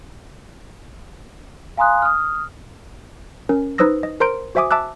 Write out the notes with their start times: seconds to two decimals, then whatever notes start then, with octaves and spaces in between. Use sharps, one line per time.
1.77 F5 G#5 A#5 C6 D#6 F#6
2.02 D#6 F6
3.49 C#4 A#4
3.78 D#4 B4 C5 D#6 E6 A#6
4.03 D#5
4.20 A#4 C5 A#5 C6 G6 D7
4.55 F#4 C5 E5 G#5 D6 D#6
4.71 E5 A5 D6 E6 F#6